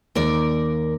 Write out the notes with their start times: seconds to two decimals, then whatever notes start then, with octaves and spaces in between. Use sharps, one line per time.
0.15 D#2 A#4 D5